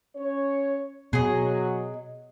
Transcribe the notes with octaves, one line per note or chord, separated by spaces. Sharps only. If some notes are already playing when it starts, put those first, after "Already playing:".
C#4 C#5
B2 F#3 G#4 D#5